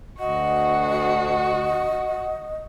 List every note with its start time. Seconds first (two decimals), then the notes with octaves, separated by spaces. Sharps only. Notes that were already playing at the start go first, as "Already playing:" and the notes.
0.19 D2 F#4 D#5 F#5